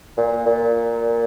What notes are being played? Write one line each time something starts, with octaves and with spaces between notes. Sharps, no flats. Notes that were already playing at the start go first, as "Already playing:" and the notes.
A#2
A#2